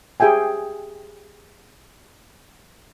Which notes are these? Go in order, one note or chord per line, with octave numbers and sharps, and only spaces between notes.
G4 G#4 E5 G5 G#5